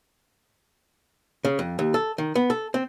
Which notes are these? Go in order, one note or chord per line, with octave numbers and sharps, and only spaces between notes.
C#3
F2
D#2
A4
D#3
B3
A4
C4